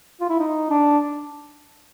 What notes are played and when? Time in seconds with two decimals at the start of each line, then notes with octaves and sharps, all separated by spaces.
0.21 F4
0.30 E4
0.40 D#4
0.70 D4